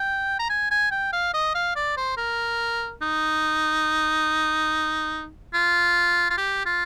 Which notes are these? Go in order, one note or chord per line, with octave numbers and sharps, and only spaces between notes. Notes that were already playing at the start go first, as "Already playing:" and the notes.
Already playing: G5
A#5
G#5
G#5
G5
F5
D#5
F5
D5
C5
A#4
D#4
F4
F4
G4
F4